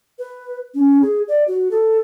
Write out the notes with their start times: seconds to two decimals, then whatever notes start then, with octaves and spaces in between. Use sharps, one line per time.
0.19 B4
0.75 C#4
1.02 G#4
1.28 D5
1.48 F#4
1.71 A4